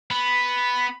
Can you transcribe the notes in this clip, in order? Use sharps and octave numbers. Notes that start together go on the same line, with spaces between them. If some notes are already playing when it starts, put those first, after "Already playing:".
B3 B5